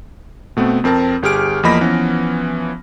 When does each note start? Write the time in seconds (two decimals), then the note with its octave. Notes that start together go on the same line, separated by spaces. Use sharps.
0.57 B2 A3 B3 C4
0.84 F2 C4 A#4 A5
1.23 G1 G4 G#4 F6 D7
1.63 E2 F3 A#3 D#5 B5 A#6
1.81 E3 F3 B3 C#4